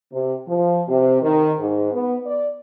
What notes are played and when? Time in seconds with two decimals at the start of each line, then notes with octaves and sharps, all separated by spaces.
0.12 C3
0.47 F3
0.88 C3
1.21 D#3
1.59 G#2
1.92 B3
2.25 D5